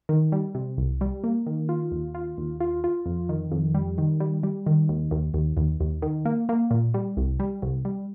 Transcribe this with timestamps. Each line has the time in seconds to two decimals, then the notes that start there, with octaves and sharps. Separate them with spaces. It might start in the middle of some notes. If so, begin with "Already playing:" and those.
0.09 D#3
0.32 G3
0.55 C3
0.78 C2
1.01 G3
1.24 A#3
1.46 D#3
1.69 F4
1.92 D#2
2.14 F4
2.37 D#2
2.60 F4
2.84 F4
3.06 F2
3.29 D#3
3.52 F2
3.75 G3
3.98 D#3
4.20 G3
4.43 G3
4.66 D#3
4.89 D#2
5.11 D#2
5.34 D#2
5.57 D#2
5.80 D#2
6.02 D#3
6.25 A#3
6.49 A#3
6.71 A#2
6.94 G3
7.17 C2
7.40 G3
7.62 C2
7.85 G3